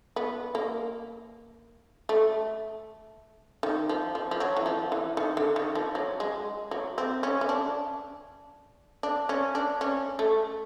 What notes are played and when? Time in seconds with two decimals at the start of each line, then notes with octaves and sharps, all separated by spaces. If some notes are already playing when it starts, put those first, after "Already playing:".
0.16 B3
0.55 A#3
2.09 A3
3.63 D#3
3.89 F3
4.15 F3
4.31 F3
4.40 F#3
4.57 E3
4.66 F3
4.92 E3
5.17 D#3
5.37 D3
5.56 D#3
5.75 F3
5.95 F#3
6.20 G#3
6.71 F#3
6.98 C4
7.23 C#4
7.41 C#4
7.49 D4
9.03 D4
9.29 C#4
9.55 D4
9.81 C#4
10.19 A3